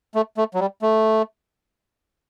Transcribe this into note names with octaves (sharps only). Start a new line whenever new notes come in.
A3
A3
F#3
G3
A3